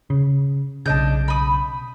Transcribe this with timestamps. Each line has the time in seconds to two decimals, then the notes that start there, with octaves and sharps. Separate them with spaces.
0.10 C#3
0.86 B1 C#3 D4 D#5 G6
1.28 B5 D#6